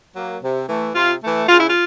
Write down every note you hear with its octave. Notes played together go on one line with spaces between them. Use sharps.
F#3 A#3
C3
E3 A3
C3 F4
E3 A3
C#3 F4
E4
F4